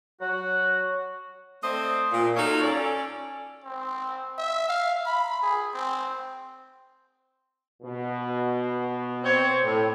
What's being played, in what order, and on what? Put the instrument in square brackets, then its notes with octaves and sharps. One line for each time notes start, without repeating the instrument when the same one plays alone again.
[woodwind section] F#3 F#4
[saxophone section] A3 C4 C5 D5 D#5
A#2
D#4 F4 F#4 A4 C#5
C#4 A4 D5
[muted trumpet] C4
E5
F5
B5
G#4
C4
[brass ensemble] B2
[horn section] C4 C5 C#5
A2